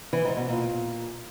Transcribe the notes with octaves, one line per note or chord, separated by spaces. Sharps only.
E3
G#2
B2
A#2